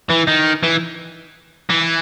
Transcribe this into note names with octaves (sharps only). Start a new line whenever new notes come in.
E3
D#3
E3
E3